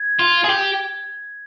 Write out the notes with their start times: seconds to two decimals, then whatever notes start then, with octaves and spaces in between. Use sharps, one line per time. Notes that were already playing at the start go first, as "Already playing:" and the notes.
Already playing: G#6
0.19 F4
0.44 G#4
0.49 G4